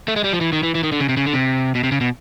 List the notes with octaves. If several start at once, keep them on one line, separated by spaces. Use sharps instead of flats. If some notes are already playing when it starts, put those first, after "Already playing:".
A3
G#3
G3
F3
E3
D#3
E3
E3
D#3
D3
C#3
C3
C#3
D3
C3
B2
C3
C#3
B2